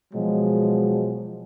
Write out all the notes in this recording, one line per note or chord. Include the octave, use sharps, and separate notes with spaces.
B2 F3 F#3 G#3